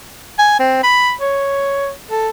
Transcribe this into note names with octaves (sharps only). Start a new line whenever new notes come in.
G#5
C4
B5
C#5
A4